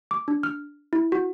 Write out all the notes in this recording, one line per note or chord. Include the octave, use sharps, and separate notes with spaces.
D6
D4
F6
E4
F#4